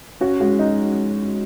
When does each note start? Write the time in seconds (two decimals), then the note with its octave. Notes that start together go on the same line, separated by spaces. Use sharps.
0.21 C#4 F#4
0.40 G#3 F#4
0.59 D#4